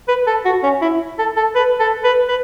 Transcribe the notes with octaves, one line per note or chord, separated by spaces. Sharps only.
B4
A4
F#4
C#4
E4
A4
A4
B4
A4
B4
B4